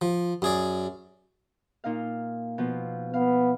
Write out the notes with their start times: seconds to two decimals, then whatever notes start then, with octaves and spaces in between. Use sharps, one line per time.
0.01 F3
0.42 F#2 G#4 D5
1.84 A#2 D#4 F5
2.58 B2 F3
3.14 B3 F5